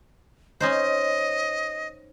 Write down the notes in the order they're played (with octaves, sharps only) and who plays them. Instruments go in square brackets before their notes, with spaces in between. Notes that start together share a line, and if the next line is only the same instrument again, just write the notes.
[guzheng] C#4 D#4 C5 [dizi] D#5